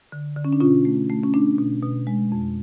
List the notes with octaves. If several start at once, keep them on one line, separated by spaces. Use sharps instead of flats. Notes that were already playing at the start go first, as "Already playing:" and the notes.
D3
D3
C#4
D4
B2 C#4 F4
A3
A3
C#4
A3 D4
B2
B2
G#3
F2